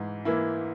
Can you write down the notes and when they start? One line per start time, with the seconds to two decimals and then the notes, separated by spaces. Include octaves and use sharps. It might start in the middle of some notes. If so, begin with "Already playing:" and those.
Already playing: G#2 E3
0.25 E3 A#3 E4